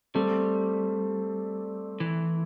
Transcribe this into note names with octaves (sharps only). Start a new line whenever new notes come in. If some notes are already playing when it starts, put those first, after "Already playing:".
G3 A3 C4
E3